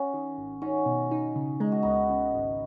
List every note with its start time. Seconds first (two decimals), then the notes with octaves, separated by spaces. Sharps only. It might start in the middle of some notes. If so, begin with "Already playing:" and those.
Already playing: C#4 F#4
0.14 D#3
0.38 G#1
0.62 C#4 D#4 F#4
0.86 B2
1.11 D#4
1.36 C#3
1.60 G#3 D#4
1.72 F#4
1.83 C#2 B3 D#4
2.10 C#3
2.34 G#1